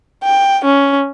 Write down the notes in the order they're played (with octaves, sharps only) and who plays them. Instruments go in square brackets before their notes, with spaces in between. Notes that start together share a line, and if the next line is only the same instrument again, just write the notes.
[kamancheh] G5
C#4